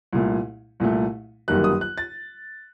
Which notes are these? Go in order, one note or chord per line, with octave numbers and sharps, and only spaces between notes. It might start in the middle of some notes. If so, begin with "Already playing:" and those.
C2 A#2 A3
C2 A#2 A3
G1 F#2 D#3 G3 A#3 F#6
D#6
F#6
A6